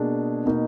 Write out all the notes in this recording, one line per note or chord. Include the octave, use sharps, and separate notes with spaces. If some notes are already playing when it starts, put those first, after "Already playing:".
Already playing: B2 A#3 D4 G#4
B2 A#3 D#4